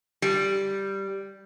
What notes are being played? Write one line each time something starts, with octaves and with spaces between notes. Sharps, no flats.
G3